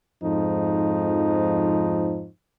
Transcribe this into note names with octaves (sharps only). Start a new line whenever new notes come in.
F2 G#2 F3 D#4